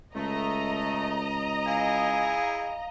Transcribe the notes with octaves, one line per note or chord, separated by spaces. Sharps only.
C#2 A3 D#5 A#5
E4 G#4 F5